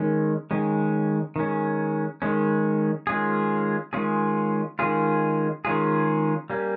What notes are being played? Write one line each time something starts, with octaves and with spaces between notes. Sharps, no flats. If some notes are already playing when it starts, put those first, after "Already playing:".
Already playing: D#3 G#3 C#4
D#3 G#3 C#4
D#3 G#3 C#4
D#3 G#3 C#4
D#3 G#3 C#4 F4 G#4
D#3 G#3 C#4 F4 G#4
D#3 G#3 C#4 F4 G#4
D#3 G#3 C#4 F4 G#4
G3 A#3 C#4